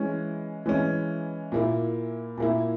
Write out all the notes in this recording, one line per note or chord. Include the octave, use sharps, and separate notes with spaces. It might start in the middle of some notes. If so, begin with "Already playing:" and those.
Already playing: E3 G#3 C#4
E3 G#3 C#4
A#2 A#3 E4
A#2 A#3 E4